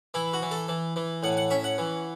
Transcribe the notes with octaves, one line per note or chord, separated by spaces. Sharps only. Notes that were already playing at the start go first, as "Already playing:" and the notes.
E3 E4
F#4
E3
A4
E3
E3
A2 F#5
F#5
C#4 E5
F#5
E3